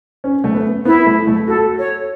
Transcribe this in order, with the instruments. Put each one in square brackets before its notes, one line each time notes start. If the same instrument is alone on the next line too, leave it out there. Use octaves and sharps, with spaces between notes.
[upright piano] C#4
A3
B3
[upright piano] B3 [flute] E4
[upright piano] A3
A3
[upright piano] F#4 [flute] A4
[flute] C#5